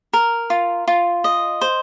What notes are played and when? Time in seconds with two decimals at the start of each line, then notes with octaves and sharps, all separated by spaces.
0.13 A#4
0.50 F4
0.88 F4
1.24 D#5
1.61 C5